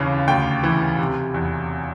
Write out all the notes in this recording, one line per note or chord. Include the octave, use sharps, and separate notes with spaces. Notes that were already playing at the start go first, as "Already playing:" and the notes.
Already playing: D#2 C#3 E3
D2 G5
E3
C3
E2